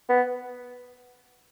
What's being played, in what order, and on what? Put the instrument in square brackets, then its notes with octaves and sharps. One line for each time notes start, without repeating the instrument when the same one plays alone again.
[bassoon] B3